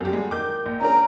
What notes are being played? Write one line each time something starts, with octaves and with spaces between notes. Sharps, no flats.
F#2 D3 F#4 G4
G3 G#3
D#3 D6 G6
A#1
A#2 C#3 C#4 D4 A#4 A#5